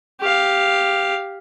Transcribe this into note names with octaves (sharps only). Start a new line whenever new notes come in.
G4 F5